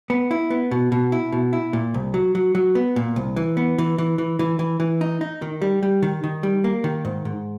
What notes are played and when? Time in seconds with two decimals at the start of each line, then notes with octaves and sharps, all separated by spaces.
0.10 B3
0.31 E4
0.50 B3
0.71 B2
0.92 B2
1.12 E4
1.32 B2
1.53 E4
1.73 A#2
1.94 C2
2.14 F#3
2.35 F#3
2.55 F#3
2.75 B3
2.96 A#2
3.16 C2
3.36 E3
3.57 B3
3.78 E3
3.98 E3
4.18 E3
4.39 E3
4.59 E3
4.80 E3
5.01 D#4
5.21 D#4
5.42 D#3
5.62 G3
5.83 G3
6.02 D#3
6.24 D#3
6.43 G3
6.64 A#3
6.84 D#3
7.05 G#2
7.25 G#2